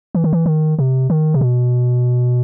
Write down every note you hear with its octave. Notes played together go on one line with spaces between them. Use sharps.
E3
D#3
E3
D#3
C3
D#3
C3
B2